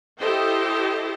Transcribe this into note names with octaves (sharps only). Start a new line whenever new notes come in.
E4 G4 A4 C5 D#5 G5